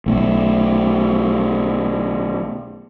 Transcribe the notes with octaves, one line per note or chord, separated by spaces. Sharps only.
B1 A3